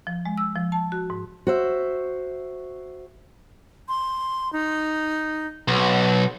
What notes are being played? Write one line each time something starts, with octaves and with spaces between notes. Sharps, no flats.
F3
G#3
E6
F3
A5
F#4
G#2
F#4 C5 E5
C6
D#4
B1 F#5